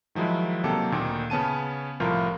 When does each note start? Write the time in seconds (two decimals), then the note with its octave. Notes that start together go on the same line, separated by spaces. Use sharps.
0.15 D#3 F3 F#3 G#3 E4
0.64 C3 D#3 F#3 A#3 G4 A4
0.92 D2 A#2 D#3
1.30 C#3 B3 C#4 A5 D#7
2.00 C2 A2 F3 F4 A#4